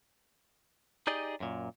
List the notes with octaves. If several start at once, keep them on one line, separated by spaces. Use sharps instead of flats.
D#4 G4 G#4 D5 D#5
F#2 A#2